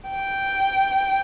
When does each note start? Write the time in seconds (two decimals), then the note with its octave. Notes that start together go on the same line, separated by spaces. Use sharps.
0.10 G5